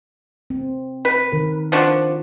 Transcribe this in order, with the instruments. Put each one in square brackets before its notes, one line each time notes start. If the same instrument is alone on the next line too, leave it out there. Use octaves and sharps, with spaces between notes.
[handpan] C4
[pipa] B4
[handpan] D#3 A#4
[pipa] F3 D4 F#4